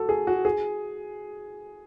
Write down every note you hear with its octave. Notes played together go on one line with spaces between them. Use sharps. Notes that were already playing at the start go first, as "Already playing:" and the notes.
Already playing: F#4 A4
G#4
F#4
G#4